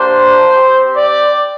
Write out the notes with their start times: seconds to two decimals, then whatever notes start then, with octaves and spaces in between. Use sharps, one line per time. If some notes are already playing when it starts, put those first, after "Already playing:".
Already playing: A#3 D4 G4 C5
0.54 C4 G4
0.94 D5